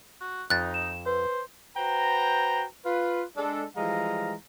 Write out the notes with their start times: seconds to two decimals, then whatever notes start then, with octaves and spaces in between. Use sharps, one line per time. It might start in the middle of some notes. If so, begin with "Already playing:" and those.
0.21 F#4
0.50 F2 D#4 F#6 A6
0.74 E7
1.06 B4 C5
1.77 F#4 B4 C5 G5 A#5
2.86 F4 B4
3.36 G#3 D4 A4
3.77 E3 F3 G3 G#3 F5 A#5